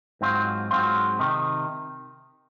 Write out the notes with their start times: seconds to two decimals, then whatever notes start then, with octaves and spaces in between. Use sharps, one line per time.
0.21 G#2 F#3 C4 F4
0.71 G#2 F#3 C4 F4
1.19 C3 D#3